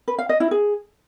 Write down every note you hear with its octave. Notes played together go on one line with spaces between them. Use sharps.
B4
F5
D#5
E4
G#4